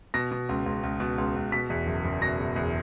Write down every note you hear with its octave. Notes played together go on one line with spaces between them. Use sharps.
B2 A#6
B2
C#2
C#2
C#2
B2
C#2
C#2
B2 B6
E2
F#1
F#1
B2 A#6
B2
E2